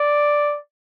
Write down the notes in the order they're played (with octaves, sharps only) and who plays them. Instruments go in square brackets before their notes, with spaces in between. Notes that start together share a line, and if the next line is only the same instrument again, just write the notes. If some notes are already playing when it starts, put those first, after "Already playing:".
Already playing: [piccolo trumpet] D5